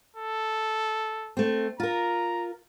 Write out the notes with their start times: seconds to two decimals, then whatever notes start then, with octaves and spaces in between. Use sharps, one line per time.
0.16 A4
1.37 A3 C4
1.80 F4 A#4 A#5